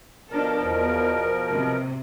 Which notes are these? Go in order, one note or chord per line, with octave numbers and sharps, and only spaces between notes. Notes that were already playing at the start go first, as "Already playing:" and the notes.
B2 F3 D4 A4 A#4
E2
C3